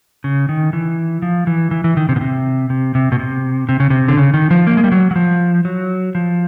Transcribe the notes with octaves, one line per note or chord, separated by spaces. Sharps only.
C#3
D#3
E3
F3
E3
E3
E3
D#3
C3
B2
C3
C3
C3
B2
C3
C3
C#3
C3
D3
C#3
D#3
F3
A#3
G#3
G3
F#3
F#3
F3
F#3
F3